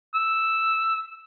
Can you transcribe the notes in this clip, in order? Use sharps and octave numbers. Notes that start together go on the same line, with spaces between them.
E6